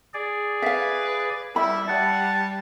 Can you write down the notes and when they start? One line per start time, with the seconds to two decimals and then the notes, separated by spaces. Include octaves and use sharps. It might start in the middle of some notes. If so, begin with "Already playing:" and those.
0.14 G#4 D5
0.62 B4 E5 F5
1.56 G3 E4 B5
1.88 G3 F#5 A5